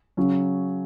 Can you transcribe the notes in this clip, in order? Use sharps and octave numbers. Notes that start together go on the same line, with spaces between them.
C#3 F#3 C#4